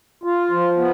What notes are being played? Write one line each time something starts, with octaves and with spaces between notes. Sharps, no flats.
F4
F3
B3